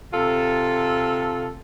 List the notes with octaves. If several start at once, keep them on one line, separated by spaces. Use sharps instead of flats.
C3 F4 A4